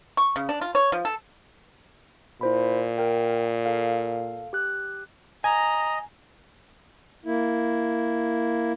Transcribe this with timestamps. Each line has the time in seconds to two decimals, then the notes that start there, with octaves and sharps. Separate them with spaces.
0.17 C#6
0.36 C#3
0.49 D4
0.61 F4
0.75 C#5
0.92 F3
1.05 A4
2.41 A#2 E4 C5 B5
2.98 A#4 G5
3.66 A4 F5
4.53 G4 F#6
5.44 D#5 G#5 A#5
7.26 A#3 E4